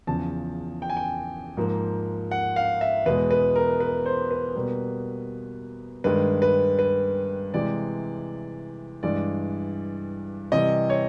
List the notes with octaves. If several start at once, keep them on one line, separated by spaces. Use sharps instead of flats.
E2 C#3 F3 A5
G5
G#5
G5
G#2 F3 A#3
F#5
F5
E5
E2 B2 G#3 B4
B4
A#4
B4
C5
B4
B2 G3 A#3
G2 D#3 G#3 B4
B4
B4
C3 E3 G#3 D5
G2 E3 G#3 D5
C3 E3 G3 D#5
C#5